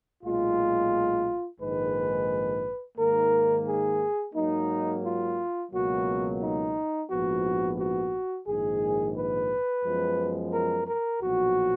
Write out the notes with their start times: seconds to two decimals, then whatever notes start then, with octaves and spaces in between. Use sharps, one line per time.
0.23 B1 A#2 G#3 F4
1.60 A#1 G#2 D#3 G#3 B4
2.97 G#2 D#3 A#3 A#4
3.66 G#4
4.34 G#2 F#3 A#3 D#4
5.03 F4
5.71 C#2 B2 F#3 A#3 F#4
6.41 D#4
7.10 A#1 G#2 F3 B3 F#4
7.78 F#4
8.47 A#1 G#2 D#3 G#4
9.15 B4
9.83 F#2 F3 G#3 B3
10.52 A#4
10.86 A#4
11.21 B1 A#2 F3 F#4